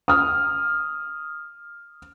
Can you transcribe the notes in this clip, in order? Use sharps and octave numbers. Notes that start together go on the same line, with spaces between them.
D#6 F6